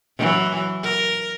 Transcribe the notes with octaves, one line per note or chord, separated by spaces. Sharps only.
E3 F#3
A#4